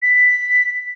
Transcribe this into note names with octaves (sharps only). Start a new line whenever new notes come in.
B6